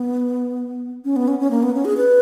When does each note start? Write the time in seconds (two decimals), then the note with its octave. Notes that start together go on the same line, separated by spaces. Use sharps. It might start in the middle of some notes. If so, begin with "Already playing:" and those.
Already playing: B3
1.05 C#4
1.16 B3
1.28 C#4
1.39 C#4
1.51 A#3
1.63 B3
1.74 C#4
1.85 G#4
1.97 B4